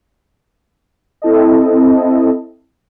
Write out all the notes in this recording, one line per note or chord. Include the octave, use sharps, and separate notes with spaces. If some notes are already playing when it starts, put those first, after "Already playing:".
C4 E4 A4 D#5